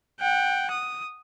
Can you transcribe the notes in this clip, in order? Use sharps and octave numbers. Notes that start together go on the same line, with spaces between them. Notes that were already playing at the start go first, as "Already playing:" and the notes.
F#5 G5
D#6